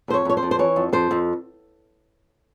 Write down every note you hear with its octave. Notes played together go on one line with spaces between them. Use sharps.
F2 C5
C#5
F2 C#5
C5
F2
C5
E3 C#5
F2
F2 C5
F2